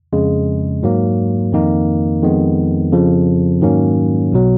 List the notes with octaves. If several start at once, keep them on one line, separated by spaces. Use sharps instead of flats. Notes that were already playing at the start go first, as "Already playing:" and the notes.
F2 C#3 G#3
G#2 F#3 A#3
F2 D#3 A#3 D#4
F2 D#3 G#3 B3
F2 C#3 F3
G#2 D#3 F#3 A#3 C#4
B1 B2 F#3